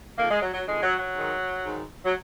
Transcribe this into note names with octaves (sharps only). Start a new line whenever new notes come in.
F2 D#3 A#3
G#3
F#3
F#3
F2 D#3 G#3
F#3
F#3
G#2 D#3
G#2 D#3
F#3